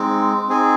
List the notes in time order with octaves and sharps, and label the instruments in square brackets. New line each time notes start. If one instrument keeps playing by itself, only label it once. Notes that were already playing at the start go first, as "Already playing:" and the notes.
Already playing: [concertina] G#3 C4 D#4
C4 D#4 G#4